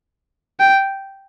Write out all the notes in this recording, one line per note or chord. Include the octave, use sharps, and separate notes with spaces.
G5